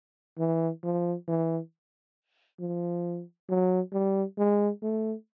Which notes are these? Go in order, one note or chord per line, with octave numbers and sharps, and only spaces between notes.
E3
F3
E3
F3
F#3
G3
G#3
A3